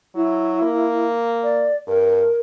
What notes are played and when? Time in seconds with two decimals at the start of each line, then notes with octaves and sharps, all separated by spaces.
0.15 F#3 E4
0.62 A#3
1.43 D5
1.87 G2 A#4